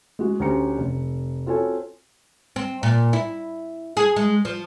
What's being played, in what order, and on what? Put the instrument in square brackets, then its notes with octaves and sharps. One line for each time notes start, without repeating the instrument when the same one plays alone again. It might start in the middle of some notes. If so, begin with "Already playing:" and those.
[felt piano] G#3 F#4 G#4
D2 C#4 G4 A#5 C#7
F1
C4 F4 F#4 A4 C#5 G#5
[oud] C4
A#2
E4
G#4
G#3
F3